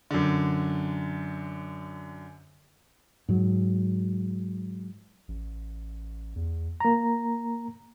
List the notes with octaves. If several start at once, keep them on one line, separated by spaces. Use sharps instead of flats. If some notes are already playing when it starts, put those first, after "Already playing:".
F#2 D3
G#2 F#3
A1
E2
A#3 A#5